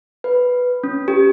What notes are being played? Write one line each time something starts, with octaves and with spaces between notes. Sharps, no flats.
B4
C#4
G4